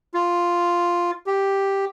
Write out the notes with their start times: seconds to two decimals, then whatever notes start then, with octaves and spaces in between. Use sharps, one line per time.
0.14 F4
1.27 G4